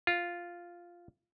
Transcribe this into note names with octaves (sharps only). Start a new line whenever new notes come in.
F4